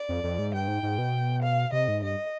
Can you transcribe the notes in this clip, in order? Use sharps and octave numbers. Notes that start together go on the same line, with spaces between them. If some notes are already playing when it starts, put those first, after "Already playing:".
Already playing: D5
F2
F2
G#2
G2 G5
G#2
G#2
B2
F5
C3 D#5
G#2
G2 D#5